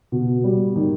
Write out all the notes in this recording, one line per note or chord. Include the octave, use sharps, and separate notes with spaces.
B2
G3
D#3